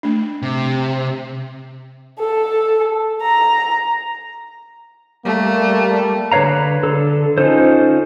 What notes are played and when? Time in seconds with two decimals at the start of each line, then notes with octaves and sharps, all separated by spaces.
0.03 A3 D4
0.42 C3
2.19 A4
3.22 A#5
5.25 G3 A3 A#3
6.32 D3 B4 C#5 F5 A#5
6.83 D3 A4
7.38 C#4 D#4 F4 A4 C5